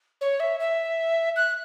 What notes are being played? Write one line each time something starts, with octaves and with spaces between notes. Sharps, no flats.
C#5
E5
E5
F#6